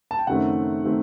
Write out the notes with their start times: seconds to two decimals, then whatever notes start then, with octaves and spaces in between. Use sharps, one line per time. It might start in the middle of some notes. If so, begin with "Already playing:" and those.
0.11 A5
0.19 G5
0.27 F#1 F#2 D#3 A3 C4 F#5
0.84 D#3 A3 C4